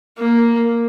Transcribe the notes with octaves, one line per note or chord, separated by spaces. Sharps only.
A#3